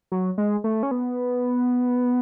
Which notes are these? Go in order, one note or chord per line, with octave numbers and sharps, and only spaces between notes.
F#3
G#3
A3
C#4
B3